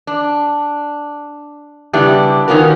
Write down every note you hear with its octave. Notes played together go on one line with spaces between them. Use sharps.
D4
C#3 G3 B3 D4 E4 G4
D#3 B3 C#4 F4 F#4 A#4